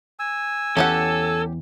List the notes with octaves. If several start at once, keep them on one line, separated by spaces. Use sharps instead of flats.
G#5 E6
E2 E3 C#4 G4 A4 F#5